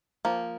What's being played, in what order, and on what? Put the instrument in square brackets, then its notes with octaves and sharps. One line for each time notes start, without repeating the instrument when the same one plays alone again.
[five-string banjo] F3 A#3